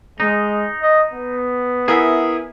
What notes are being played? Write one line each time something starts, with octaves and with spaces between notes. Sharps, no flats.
G#3 D#4
D#5
B3
E4 G#4 A#4 E5 F#5